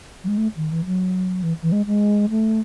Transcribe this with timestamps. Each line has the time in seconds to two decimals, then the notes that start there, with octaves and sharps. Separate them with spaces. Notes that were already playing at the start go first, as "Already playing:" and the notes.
0.24 F#3
0.28 G#3
0.38 A3
0.57 D#3
0.71 E3
0.85 F#3
1.43 E3
1.62 E3
1.72 G#3
1.86 G#3
2.30 A3